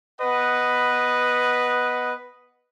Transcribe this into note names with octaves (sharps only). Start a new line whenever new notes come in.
B3 B4 D#5 F#5